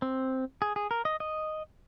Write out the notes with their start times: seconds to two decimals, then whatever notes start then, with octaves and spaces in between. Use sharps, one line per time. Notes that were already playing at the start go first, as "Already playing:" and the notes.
0.02 C4
0.62 G#4
0.76 G#4
0.91 A#4
1.05 D#5
1.20 D#5